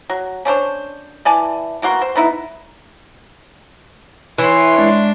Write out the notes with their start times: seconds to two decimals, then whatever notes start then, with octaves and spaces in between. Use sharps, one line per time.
0.10 F#3
0.45 C#4 D4 C5 C#5
1.25 E3 D5 G#5 A5
1.82 B2 A#3 F#4 C6
2.02 C5
2.16 B3 D#4 E4
4.38 E3 C#5 C6
4.74 G#3 D4